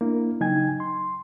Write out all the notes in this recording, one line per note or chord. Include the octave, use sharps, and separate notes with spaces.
A#3 D4 E4
C#3 F#3 D#4 G5 G#5 G#6
C6